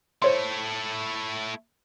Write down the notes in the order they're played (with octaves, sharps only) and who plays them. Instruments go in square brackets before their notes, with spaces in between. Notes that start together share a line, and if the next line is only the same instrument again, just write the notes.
[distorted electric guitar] A3 E4 [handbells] C5 C#5 C6